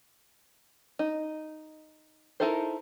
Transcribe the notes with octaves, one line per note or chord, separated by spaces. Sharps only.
D#4
D#4 E4 A4 A#4 C5